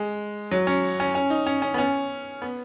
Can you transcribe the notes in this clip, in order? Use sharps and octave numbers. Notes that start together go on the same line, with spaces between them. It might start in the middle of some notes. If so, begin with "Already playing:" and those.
Already playing: G#3
F#3
C#4
C#4
C#4
D#4
C#4
C#4
B3
C#4
B3